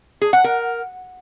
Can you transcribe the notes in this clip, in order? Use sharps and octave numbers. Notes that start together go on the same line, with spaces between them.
G#4
F#5
A#4